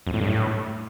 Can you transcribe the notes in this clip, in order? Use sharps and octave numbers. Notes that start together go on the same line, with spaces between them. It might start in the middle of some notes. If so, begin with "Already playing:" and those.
F2
A2
G2
A2